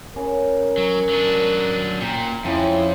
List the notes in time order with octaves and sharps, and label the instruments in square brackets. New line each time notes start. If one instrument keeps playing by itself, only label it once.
[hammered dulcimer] C#3 [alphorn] A#4
[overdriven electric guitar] F#3
F#3 D4
[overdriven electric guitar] A#2 [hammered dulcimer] G5 A#5
[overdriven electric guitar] F2 [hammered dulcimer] C#3 F3 C4 [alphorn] E4